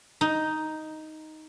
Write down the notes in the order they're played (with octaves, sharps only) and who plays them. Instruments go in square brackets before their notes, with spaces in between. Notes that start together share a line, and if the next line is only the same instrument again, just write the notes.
[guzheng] D#4